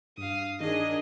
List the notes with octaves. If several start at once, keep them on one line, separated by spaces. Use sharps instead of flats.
G2 F5 D#6
D#3 D4 G#4 A#4 D#5